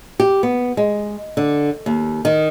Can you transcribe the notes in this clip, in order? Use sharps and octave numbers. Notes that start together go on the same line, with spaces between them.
G4
B3
G#3
D3
D#2
D#3